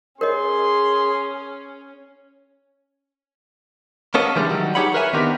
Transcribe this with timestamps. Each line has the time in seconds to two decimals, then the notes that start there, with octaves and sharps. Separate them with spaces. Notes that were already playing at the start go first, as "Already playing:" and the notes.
0.21 C#4 G#4 A#4 C#5 D#5 C6
4.14 A#3 B3 C#4 A4 A#4 D#5
4.36 E3 G3 G#3 D4
4.50 D#3 F#3 G3
4.75 D#4 G4 G#4 C#5 F#5 B5
4.94 A#4 B4 C#5 E5 G#5
5.13 D#3 B3 C4 D4 G4 A#4